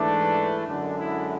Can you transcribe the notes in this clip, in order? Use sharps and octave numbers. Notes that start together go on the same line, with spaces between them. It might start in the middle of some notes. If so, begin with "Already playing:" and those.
Already playing: G#2 E3 A3 D4
F#2 D3 G#3 D4
E4